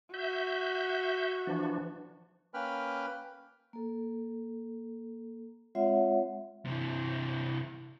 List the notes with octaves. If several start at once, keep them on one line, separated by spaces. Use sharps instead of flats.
F#4 E5 G6
E3 F3 D4
A#3 C#4 B4 G5 B5 F6
A#3 A4
G#3 C4 F4 C#5 E5 F#5
C3 E3